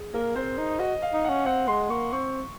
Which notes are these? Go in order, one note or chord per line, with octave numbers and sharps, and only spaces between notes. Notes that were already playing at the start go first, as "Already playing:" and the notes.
Already playing: G#4
A#3 A#4
C4 C5
D#4
F#4 D#5
F5
D#4
C#4 F#5
C4 F#5
G#3 C6
A#3 C#6
C4 C#6